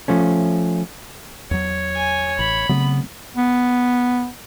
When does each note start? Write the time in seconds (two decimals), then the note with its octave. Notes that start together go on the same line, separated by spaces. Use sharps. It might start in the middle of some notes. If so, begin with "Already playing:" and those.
0.08 F3 A3 C#4
1.51 E2 F#3 C#5
1.95 G#5
2.39 A1 B5
2.69 C#3 F#3 A3 B3 C4
3.37 B3